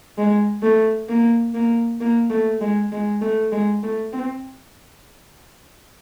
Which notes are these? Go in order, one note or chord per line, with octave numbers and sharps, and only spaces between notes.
G#3
A3
A#3
A#3
A#3
A3
G#3
G#3
A3
G#3
A3
C4